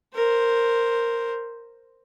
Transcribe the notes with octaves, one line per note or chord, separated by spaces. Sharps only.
A#4 C5